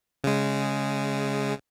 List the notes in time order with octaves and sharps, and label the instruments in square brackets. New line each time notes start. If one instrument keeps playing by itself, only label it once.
[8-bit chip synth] C#3 G#3